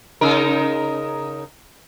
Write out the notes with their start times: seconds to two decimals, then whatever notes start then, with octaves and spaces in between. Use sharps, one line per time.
0.21 C#3 D#4 A#4